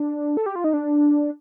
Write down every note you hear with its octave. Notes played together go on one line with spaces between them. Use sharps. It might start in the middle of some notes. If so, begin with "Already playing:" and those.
Already playing: D4
A4
G4
F4
D#4
D4